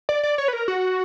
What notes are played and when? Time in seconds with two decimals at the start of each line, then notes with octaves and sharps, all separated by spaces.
0.09 D5
0.23 D5
0.38 C#5
0.48 B4
0.53 A#4
0.68 F#4